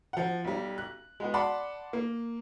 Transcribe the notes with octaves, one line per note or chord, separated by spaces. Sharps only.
F3 F#5
B1 G3
F#6
G#3 B3 F#4
D5 F#5 A5 B5 C6 D6
A#3